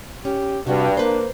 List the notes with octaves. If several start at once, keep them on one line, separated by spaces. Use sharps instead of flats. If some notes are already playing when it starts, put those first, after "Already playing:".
C#4 G4
G2 C3 G3 F#4
A#3 D4 B4 C5